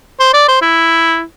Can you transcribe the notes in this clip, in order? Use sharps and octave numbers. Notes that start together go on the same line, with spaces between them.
C5
D5
C5
E4